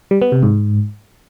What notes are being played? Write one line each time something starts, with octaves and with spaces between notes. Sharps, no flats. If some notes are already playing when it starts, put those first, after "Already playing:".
G3
B3
C3
G#2